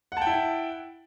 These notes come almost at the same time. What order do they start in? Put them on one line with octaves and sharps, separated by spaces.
F#5 A5 G5 E4